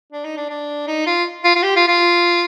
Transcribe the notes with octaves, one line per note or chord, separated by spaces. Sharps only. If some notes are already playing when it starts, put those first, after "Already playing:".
D4
D#4
D4
D4
D#4
F4
F4
F4
G4
F4
F4